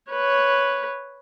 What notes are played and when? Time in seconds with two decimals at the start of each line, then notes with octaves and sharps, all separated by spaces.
0.11 B4 C#5